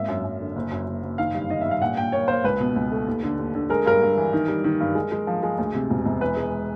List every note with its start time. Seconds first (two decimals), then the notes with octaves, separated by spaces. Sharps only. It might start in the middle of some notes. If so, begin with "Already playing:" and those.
Already playing: G#1 A#3 E5
0.08 F#2
0.24 F#2
0.40 D3
0.56 F#1
0.71 F#2
0.87 F#1
1.03 F#1
1.18 D#3 F5
1.35 G2
1.49 D#3 D#5
1.61 G2 E5
1.71 F5
1.82 A#2 F#5
1.97 A#2 G5
2.12 A#3 C#5
2.28 A#3 C5
2.44 C#2 B4
2.60 B2
2.76 C#2
2.92 A3
3.07 D#2
3.23 D3
3.39 D#2
3.55 D3
3.70 G#3 A#4
3.86 G2 A#4
4.02 G2
4.17 E3
4.33 D#3
4.48 G3
4.64 D#3
4.81 G2
4.95 G#3
5.12 G#3
5.27 F3
5.43 G#3
5.58 D2
5.75 C3
5.90 E1
6.05 E1
6.21 E3 B4
6.37 G#3